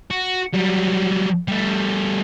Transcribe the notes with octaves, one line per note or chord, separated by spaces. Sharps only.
F#4
F#3 G3
G3 A3